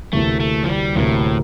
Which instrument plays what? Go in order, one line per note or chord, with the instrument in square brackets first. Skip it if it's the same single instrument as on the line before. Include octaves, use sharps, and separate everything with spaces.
[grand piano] D2 C3 E3 A#3 [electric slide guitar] A3
[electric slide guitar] A3
F3
G3
[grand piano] D2 C3 E3 A#3 [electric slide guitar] A2